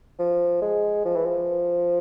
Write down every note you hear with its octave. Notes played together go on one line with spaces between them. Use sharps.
F3
G#3
F3
E3
F3